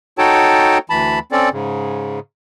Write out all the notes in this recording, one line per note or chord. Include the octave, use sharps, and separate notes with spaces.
D#4 F#4 A4 C#5 G5 A5
D2 E3 A5 B5
C4 C#4 A4 D5
G#2 C#3